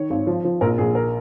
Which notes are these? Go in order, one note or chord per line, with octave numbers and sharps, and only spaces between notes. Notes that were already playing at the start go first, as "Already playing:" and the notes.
Already playing: D#3 C#5
G#1
F3
F3
A#1 A#4
A#1 G#4
A#4